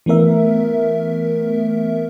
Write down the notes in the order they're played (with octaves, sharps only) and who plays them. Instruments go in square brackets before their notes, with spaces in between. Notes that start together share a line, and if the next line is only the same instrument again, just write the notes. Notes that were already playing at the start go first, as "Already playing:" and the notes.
[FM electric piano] E3 A3 B3 A#4 E5